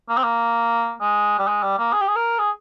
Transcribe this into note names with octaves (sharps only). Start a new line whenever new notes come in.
A#3
C4
A#3
G#3
G3
G#3
G3
A#3
G#4
G4
G#4
A#4
G#4